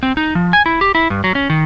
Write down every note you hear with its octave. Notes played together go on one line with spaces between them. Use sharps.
C4
D#4
F3
G#5
E4
G4
E4
G2
F#3
C#4
D#3